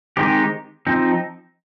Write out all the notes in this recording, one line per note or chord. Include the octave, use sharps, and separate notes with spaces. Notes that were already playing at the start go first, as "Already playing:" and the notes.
D#3 G#3 C4 D#4 G4
F3 C4 D#4